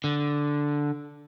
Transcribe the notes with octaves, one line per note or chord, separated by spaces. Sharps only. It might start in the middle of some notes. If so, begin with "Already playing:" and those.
D3